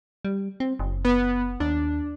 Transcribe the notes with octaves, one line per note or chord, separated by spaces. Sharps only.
G3
C4
F#1
B3
D#2 D4